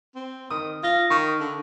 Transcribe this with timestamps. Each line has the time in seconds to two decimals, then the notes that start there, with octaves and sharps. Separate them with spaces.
0.16 C4
0.50 D#3 D#6
0.83 F4 A#6
1.10 D#3 C#6
1.40 D3